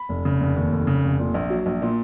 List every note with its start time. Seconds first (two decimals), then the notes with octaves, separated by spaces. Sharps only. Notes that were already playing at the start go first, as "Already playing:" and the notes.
Already playing: B5
0.09 F1
0.25 C#3
0.41 F1
0.56 D#2
0.72 F1
0.87 C#3
1.04 F1
1.19 A#2
1.34 A#1
1.50 F#3
1.66 A#1
1.82 A#2